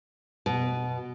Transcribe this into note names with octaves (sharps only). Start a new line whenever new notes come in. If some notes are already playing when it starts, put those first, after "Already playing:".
B2